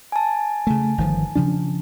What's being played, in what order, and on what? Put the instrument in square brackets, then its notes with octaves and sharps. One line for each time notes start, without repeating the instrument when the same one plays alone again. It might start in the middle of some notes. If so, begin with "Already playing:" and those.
[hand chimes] G#5 A5
[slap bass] C#3 A3
G1 D#3 F3
C#3 F3 D4